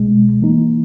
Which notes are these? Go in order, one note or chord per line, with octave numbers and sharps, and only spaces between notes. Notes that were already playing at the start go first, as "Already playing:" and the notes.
Already playing: C#2 B2 G#3
E3 A#3 D#4